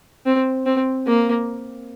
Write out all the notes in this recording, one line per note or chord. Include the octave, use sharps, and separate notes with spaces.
C4
C4
A#3